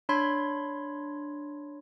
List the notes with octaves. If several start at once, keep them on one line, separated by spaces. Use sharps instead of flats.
D4 C#5 B5 C6 G#6